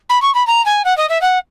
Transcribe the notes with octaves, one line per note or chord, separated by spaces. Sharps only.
B5
C#6
B5
A#5
G#5
F#5
D#5
E5
F#5